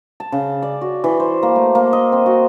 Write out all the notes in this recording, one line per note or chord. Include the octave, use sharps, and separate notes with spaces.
A5
C#3
D5
F#4
E3
C5
A#3
A3
A#3
D#5
C4
F#4